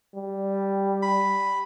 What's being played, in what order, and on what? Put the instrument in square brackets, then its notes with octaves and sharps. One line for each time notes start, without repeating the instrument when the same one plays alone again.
[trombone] G3
[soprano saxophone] B5